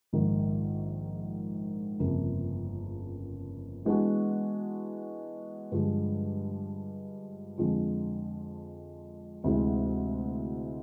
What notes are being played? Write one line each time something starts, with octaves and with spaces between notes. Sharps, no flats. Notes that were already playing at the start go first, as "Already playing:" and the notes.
A#1 G#2 D#3
G1 F2 C#3 F3 A#3
E3 G#3 B3 D4 F#4
G2 D3 F3 G#3
F2 D3 F3 G#3
D2 C3 E3 G#3